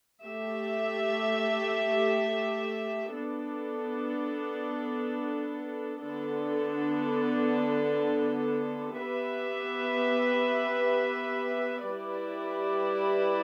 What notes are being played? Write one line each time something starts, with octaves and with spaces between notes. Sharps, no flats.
A3 G4 E5
B3 D4 A4
D3 B3 D4 A4
B3 G4 B4 E5
G3 E4 G4 B4 D5